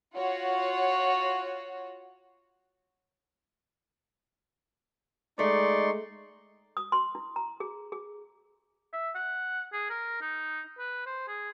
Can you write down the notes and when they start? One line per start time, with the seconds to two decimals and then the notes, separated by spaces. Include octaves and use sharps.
0.14 F4 F#4 C#5 F#5
5.39 G#3 A3 D#4 D5 C6 C#6
6.77 D#6
6.92 C6
7.15 E4
7.36 A#5
7.60 G#4
7.92 G#4
8.93 E5
9.15 F#5
9.73 G#4
9.90 A#4
10.22 D#4
10.79 B4
11.06 C5
11.28 G#4